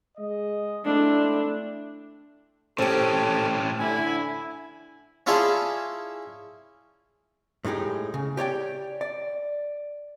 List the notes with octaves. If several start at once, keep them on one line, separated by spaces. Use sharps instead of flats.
G#3 D#5
A3 C4 D4 E4
A2 C4 C#4 G4 A4
D3 E4 G#5
C#4 E4 F4 G#4 D5 A5
A2 G#3 D#4 G4 G#4
C#3
G4 C#5 D5 G5
D5